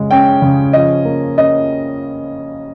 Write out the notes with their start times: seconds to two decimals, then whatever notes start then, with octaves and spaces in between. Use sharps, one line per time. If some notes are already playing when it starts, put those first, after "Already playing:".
Already playing: C#3 G#3
0.11 C#4 G5
0.42 C#3
0.73 F3 D#5
1.05 A#3
1.37 C#4 D#5